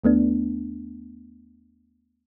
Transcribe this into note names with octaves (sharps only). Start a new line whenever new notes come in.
D#2 A3 B3 D4